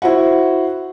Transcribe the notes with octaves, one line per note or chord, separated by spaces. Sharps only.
E4 F#4 C5 F#5